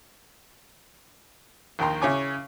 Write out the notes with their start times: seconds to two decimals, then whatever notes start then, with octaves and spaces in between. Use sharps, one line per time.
1.79 A#1 D#2 D#3 G5 A#5 C6
2.02 C#3 E4 C#5 G#5 D6